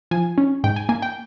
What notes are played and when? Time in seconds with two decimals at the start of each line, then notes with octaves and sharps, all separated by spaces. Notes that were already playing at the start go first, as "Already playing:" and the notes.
0.11 F3 G#5
0.38 C#4
0.64 G#2 G5
0.76 G#5
0.89 A#3 G#5
1.02 G5